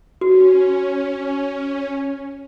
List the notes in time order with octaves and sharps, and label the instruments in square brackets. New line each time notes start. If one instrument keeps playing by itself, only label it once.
[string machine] C#4 [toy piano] F#4